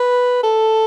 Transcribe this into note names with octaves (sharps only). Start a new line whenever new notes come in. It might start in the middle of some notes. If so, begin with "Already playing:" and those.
Already playing: B4
A4